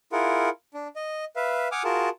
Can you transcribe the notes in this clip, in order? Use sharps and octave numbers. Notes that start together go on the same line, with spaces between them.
E4 F4 G#4 A#4 F#5
D4
D#5
B4 E5 F5
F#5 G#5 D6 D#6 F6
F4 F#4 G#4 A#4 A5